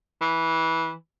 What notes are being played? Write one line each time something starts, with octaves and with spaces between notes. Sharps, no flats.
E3